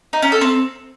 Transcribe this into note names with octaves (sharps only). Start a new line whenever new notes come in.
D#4
C#4
A4
C4